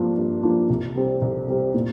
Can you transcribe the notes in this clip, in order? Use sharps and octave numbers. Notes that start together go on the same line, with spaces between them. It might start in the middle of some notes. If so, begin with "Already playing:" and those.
Already playing: G2 F3 A#3 D4 F4
G2
F3 A#3 D4 F4
C2
C3 G3 C4
C2
C3 G3 C4
A#2